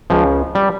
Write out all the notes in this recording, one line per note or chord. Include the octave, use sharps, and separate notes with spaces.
C#2 C#3 F3
G3